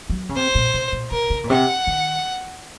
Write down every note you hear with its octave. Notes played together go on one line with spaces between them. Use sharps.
F#3
C#3
C3 C5
A#2
C3
A#2
C3 A#4
C#3
A#2
C3 F#5
D#3